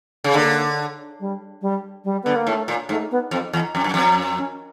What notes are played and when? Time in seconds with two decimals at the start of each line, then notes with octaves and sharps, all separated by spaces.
0.24 C#3
0.34 D3 A#3
1.20 G3
1.61 G3
2.04 G3
2.23 D3 B3
2.35 A#3
2.47 A2 A3
2.68 A#2
2.89 G#2 A3
3.11 B3
3.31 F2 C4
3.53 E2
3.75 F2 C#4
3.84 F#2
3.94 F2 C4
4.17 C#4
4.37 C#4